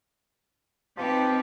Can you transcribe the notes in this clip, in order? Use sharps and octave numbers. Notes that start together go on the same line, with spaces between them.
F3 C4 D#4 G4 B4